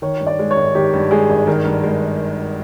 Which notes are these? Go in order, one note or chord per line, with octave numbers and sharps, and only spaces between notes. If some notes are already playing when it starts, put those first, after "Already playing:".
D#3 C#5
G2
D5
G#3
C#5
G#1
D#3 G4
G2
G#3 G#4
G#1
D#3 A#4
G2
G#3